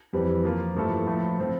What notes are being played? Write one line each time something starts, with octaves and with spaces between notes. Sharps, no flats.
F2 E3 G3 C4
F3 A#3 F4
G2 F3 A3 E4 A4
A2 F3 A3 E4
F3 C4 F4